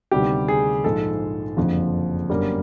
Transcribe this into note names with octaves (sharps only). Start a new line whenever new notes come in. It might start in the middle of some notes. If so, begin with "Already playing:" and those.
D2 C3 D#3 G3 B3 G4
G#4
A#1 G#2 F3 G#3 A4
F#1 F2 D3 F3
G1 F#2 D3 G3 A#3